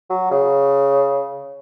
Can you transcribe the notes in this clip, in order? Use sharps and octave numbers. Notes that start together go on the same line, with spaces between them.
F#3
C#3